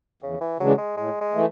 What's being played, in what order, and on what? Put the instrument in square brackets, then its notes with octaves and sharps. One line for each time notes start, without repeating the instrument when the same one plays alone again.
[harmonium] E2 [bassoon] C#3
[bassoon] E3
[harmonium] C#3 E3 G#3 D4 [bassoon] F#3
[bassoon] G#3
[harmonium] A2 [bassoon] G#3
[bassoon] G#3
[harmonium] E3 A3